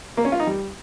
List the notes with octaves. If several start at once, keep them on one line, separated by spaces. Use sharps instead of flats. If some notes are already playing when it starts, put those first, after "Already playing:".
A#3
C#4
F4
D#4
G3